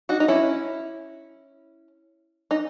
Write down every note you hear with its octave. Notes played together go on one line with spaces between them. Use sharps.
D#4 F#4
D#4
C#4 E4
D#4